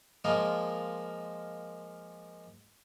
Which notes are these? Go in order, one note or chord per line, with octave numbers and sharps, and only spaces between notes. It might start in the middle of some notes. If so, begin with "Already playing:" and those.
F3 G#3 A#3 F4 A#4 D#5